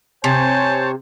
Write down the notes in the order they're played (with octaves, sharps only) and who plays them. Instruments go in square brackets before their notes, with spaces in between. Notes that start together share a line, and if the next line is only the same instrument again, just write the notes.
[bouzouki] C3 [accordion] C5 C#5 [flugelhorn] G#5 [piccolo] A5